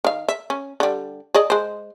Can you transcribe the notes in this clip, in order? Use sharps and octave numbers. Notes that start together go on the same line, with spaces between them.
D#3 F5
E5
C#4
D3 G3
G#4 D5 D#5
G#3 C5